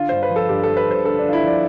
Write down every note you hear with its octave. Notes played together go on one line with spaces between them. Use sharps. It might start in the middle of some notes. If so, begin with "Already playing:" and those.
Already playing: D3 F4
G2 C5
B4
F3
A4
G2 G4
A4
F3
B4
G2 C5
D3 A4
D4
D3
F4
E4
F3 D5